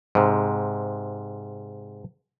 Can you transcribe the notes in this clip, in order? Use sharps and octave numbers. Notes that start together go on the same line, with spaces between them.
G#2 C3